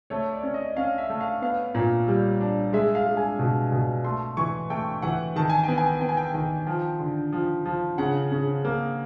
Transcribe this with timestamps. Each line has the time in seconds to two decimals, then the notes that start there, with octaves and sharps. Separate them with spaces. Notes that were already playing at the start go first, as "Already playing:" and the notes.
0.10 A3 C#5
0.32 D5
0.43 C#4
0.54 D#5
0.77 C#4 F5
0.98 E5
1.10 A3
1.21 F5
1.42 B3 F5
1.75 A#2
2.08 G3
2.41 D4
2.73 G#3 E5
2.95 F5
3.07 G#3
3.17 G#5
3.39 B2
3.72 B2
4.04 A3 C6
4.37 E3 C#6
4.70 A3 G5
5.02 E3 F#5
5.36 D#3 A5
5.50 G#5
5.63 B3 G5
5.78 G#5
6.01 B3 G5
6.09 G#5
6.17 G5
6.34 D#3 G5
6.67 F3 G5
6.99 D3
7.33 F3
7.65 F3
7.98 C#3 F#5
8.32 C#3
8.65 A#3